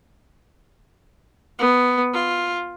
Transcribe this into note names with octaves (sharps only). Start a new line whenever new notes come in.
B3
F4